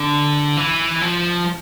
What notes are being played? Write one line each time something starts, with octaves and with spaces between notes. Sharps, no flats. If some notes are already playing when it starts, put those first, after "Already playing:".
Already playing: D3
E3
F3